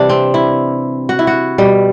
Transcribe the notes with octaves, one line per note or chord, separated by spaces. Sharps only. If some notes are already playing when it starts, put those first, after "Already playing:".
Already playing: C3 E3 G3 D4
C4
E4
F#4
E4
F#4
B2 G3